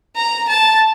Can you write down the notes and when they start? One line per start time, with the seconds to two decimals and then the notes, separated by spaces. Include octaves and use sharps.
0.16 A#5
0.49 A5